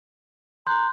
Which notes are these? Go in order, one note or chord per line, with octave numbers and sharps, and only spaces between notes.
A#5 C6 F#6 G6